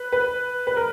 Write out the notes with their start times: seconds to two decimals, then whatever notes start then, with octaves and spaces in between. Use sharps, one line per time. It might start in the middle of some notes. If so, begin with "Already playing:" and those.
Already playing: B4
0.12 B4
0.67 B4
0.77 A#4